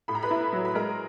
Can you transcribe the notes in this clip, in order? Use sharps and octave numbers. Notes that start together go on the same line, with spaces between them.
A2 B5
A#5
B4 B5
E4
F#3
B5
G#3 A#4 A#5